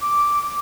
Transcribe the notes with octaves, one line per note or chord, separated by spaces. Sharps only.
D6